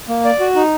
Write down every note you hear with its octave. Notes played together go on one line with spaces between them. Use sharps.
A#3
D5
F#4
D#4